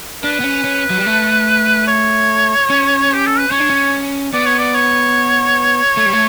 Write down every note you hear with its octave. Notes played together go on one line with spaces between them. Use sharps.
D4 B4
B3
C#4
C#4
F#3
G3
A3
C#5
C#4
G4
A4
B4
C#4 C#5
D4
C#4
B3 D5
C#5
D5
C#5
A3
G3
A3